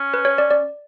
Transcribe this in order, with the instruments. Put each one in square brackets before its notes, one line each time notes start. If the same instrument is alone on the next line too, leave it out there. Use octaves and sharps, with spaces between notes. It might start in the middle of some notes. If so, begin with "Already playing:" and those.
Already playing: [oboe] C#4
[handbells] B4
C#5
D5
D5